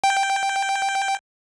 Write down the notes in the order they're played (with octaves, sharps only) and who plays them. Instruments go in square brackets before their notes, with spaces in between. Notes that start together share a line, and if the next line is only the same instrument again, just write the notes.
[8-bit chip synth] G5